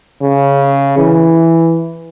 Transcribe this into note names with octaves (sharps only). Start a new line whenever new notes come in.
C#3
E3